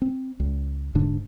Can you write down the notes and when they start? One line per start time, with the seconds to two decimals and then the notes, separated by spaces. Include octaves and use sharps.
0.02 C4
0.40 C#2
0.95 D#1 G#2 D3 D4